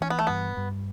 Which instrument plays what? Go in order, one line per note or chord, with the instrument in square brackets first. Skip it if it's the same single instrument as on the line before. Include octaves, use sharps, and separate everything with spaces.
[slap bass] E3 [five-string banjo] C#4
[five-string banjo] B3
A3
[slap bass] G2 [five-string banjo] B3
[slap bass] G2